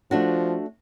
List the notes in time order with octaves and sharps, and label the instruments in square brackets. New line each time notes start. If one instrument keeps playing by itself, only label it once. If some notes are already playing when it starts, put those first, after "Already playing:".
[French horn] F3 [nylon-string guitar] A3 D4 F#4